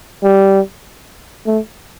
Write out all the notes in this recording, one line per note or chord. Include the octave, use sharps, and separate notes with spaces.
G3
A3